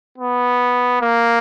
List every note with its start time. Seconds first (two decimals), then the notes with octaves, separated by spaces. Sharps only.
0.18 B3
1.02 A#3